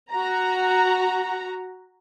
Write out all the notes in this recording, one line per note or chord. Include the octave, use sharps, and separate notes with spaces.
F#4 A#5